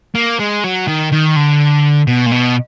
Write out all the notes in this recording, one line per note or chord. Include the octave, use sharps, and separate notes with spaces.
A#3
G#3
F#3
D#3
D#3
D3
B2
A#2
B2